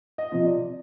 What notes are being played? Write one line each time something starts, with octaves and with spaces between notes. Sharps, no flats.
D#5
C3 F3
D5